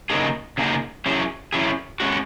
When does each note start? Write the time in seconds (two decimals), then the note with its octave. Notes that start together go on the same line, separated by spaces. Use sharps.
0.10 C#3 F#3 A#3 D#4 G#4
0.58 C#3 F#3 A#3 D#4 G#4
1.06 F#3 C#4 E4 G#4
1.53 F#3 C#4 E4 G#4
2.00 G#3 C#4 F#4